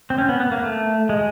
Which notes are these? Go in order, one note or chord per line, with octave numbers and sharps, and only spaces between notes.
C4
C#4
B3
B3
A#3
A3
G#3